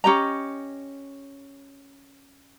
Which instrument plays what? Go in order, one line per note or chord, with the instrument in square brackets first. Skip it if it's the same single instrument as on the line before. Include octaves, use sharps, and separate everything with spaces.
[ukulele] C#4 G4 D#5 A#5